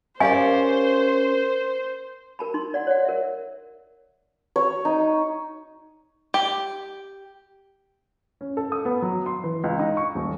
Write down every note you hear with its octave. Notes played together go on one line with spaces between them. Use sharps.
C#4 G4 A#4 C5 D5 F5 G#5
A#4 A5 B5
D#4 C6
D5 F#5
C#5 D5 F#5
A#4 E5
C#5
D#4
G4
C#4
A4
D#6
B3
F#3
C6
E3
C#2
D#4
C#6
D#1